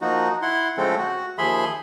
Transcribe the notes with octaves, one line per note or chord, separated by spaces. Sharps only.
F3 A#3 D#4 F#4
E4 F#5 C6
C#3 F3 G#3 A3 C4 A4
F#4
D#2 F3 G#4 E5 B5 C6